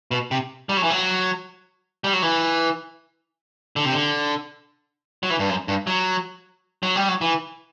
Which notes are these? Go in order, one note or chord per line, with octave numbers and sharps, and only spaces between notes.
B2
C3
G3
F#3
E3
F#3
G3
F#3
E3
D3
C3
D3
F#3
E3
G2
F#2
G2
F#3
F#3
G3
F#3
E3